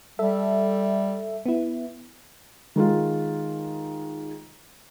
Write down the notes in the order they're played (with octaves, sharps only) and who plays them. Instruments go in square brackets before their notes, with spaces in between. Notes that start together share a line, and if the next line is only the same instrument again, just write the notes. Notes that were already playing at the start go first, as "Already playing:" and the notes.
[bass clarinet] G3 [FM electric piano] A4 E5
[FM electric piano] B3 E4
[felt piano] D#3 G#3 F4